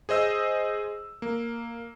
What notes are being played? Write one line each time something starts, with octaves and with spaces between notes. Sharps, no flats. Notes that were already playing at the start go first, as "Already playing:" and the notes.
G#4 C5 D#5 E6
A#3